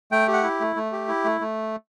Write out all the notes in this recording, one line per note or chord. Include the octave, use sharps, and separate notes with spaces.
A3 G5
G4
F#5
E4
A3
A3
G4
E4
A3
A3